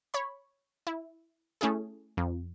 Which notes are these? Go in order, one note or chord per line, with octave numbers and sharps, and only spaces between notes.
C#5 B5
E4
A3 C#4 E4 G#4
F2